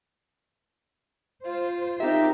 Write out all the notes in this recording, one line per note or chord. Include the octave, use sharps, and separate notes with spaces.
F4 C5
C4 D#4 G4 A#4 E5